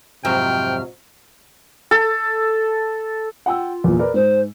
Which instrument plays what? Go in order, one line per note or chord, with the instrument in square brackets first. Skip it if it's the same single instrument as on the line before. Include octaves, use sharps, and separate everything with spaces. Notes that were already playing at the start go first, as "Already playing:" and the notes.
[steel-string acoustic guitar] F2 G#2 F#3 [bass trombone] C3 [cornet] G5 [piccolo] F6
[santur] A4
[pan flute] F4 [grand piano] F#5 G5 E6
[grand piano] E2 A#2
A#4 B4 D5
[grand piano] G#2 [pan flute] C5